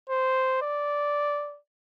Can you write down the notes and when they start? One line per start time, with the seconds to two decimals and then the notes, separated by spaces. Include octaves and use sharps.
0.09 C5
0.62 D5